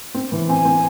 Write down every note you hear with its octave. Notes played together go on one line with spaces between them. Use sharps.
C4
E3
C4 G#5
C4